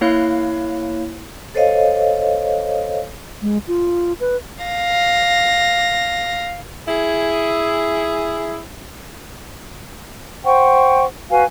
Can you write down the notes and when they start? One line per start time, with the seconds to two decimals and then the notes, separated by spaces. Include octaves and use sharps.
0.01 A#3 E4 C#5 F5 F#6
1.55 A4 C5 C#5 D#5 F5
3.42 G#3
3.68 F4
4.20 B4
4.64 F5 A#6
6.87 E4 G#4
10.45 C5 F#5 G5 C#6
11.30 F#4 B4 F5 G#5